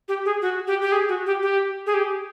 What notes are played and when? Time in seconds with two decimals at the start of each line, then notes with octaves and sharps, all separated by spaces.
0.08 G4
0.25 G#4
0.42 F#4
0.67 G4
0.82 G4
0.92 G#4
1.09 F#4
1.26 G4
1.42 G4
1.86 G#4
1.94 G4